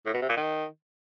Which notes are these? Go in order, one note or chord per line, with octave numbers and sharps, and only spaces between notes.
A2
B2
C3
A#2
D#3